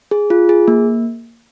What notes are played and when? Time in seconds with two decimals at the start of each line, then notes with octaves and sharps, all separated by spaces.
0.11 G#4
0.30 F4
0.49 G#4
0.68 A#3